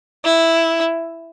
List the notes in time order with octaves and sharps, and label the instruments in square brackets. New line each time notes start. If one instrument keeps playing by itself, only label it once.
[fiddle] E4